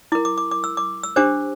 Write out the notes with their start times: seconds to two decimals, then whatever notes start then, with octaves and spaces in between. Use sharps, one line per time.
0.12 E4 A#4 D6
0.25 D6
0.38 D6
0.51 D6
0.64 E6
0.77 D6
1.03 E6
1.16 D4 G4 C5 D6